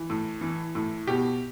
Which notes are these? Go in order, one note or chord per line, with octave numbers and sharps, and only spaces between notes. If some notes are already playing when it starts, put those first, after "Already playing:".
Already playing: E3
A2
E3
A2
B2 G4